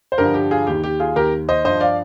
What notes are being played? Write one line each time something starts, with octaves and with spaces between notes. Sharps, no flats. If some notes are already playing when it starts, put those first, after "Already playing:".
C5
G2 D3 F3 G4 A#4
G4
F4 G#4
D#2 D#3 G4
G4
F4 G#4
D#2 D#3 G4 A#4
C5 D#5
G2 F3 C5 D#5
D5 F5